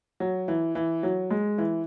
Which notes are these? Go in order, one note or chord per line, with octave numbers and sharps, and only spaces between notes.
F#3
E3
E3
F#3
G#3
E3